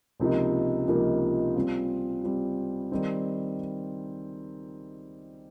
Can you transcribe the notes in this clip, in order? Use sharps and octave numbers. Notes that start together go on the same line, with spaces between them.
C#2 C3 F3 A#3 D#4
C#2 C3 F3 A#3 D#4
G3 C4 F4
G3 C4 F4
D#3 G3 C4 D#4